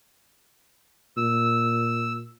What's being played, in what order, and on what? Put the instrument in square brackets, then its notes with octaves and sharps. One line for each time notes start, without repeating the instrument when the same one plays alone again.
[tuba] A#2 [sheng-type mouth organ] E6